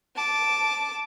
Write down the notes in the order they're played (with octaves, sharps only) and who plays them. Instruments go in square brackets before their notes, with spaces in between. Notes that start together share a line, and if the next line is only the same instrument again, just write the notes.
[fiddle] A5 D6